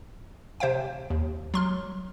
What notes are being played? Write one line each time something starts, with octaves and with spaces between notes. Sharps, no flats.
C3 C5 E5 F5 G5
D#2
F#3 C6 F6